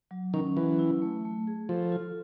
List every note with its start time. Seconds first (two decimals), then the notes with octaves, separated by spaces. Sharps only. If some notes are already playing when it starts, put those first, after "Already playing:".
0.11 F#3
0.34 D#3 C#4
0.56 E3 F#3
0.79 E4
1.02 A3
1.25 A3
1.47 G#4
1.69 F3 A4
1.92 F4